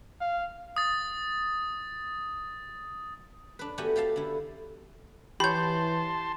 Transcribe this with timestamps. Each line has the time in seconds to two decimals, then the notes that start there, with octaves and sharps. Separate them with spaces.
0.21 F5
0.76 D#6 A6
3.59 D4 B4
3.78 A3 B3 F#4 G4 G#5
3.96 G4 A4 F5 A5
4.16 D3 E4
5.40 E3 G4 C#5 A5 B5 C6 G6